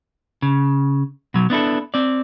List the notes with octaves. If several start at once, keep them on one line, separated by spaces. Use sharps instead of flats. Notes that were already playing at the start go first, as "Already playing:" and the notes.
C#3
B2 F#3
B3 D4 E4 A4
C4 D5